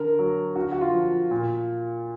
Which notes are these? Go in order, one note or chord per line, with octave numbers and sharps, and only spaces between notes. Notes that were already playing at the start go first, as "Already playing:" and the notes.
Already playing: D3 A#4
F#3
D3 F#4
F#4
F4
F3
A#2